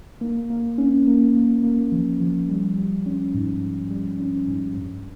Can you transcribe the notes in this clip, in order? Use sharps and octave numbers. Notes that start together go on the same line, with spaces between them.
A#3
A#3
C#4
A#3
A#3
A#3
F3
F3
G3
G3
C#4
G#2
G#2
G3
C#4
G#2
G2